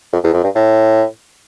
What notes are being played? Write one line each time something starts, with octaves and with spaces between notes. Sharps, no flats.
F2
E2
F2
G2
A2